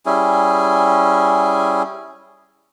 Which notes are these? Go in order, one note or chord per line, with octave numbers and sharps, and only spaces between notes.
G3 C#4 E4 G#4